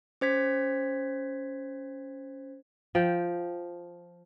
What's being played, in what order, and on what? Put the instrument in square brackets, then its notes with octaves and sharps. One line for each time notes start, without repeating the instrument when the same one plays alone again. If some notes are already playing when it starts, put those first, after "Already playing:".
[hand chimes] C#4 C5 G#6 B6
[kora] F3 G5